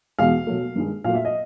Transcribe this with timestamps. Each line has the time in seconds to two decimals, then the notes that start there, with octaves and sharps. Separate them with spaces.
0.19 E2 B2 G#3 F5
0.47 B2 F#3 A3
0.76 G2 D#3 G#3
1.04 A#2 F#3 A3 F5
1.15 E5
1.25 D#5